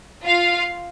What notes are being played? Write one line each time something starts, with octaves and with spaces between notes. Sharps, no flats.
F4 F5